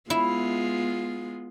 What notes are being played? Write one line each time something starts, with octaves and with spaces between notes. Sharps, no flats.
G#3 B3 E4 F4